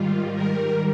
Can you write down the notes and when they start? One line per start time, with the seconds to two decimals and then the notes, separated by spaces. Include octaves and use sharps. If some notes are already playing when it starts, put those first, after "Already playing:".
Already playing: G#2 D#3 G3 F4
0.33 A#4